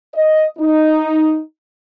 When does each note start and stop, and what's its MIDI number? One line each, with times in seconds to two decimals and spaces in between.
0.14 0.45 75
0.58 1.39 63